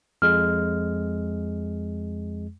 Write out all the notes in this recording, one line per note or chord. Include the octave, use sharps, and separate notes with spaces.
F2 G#3 F6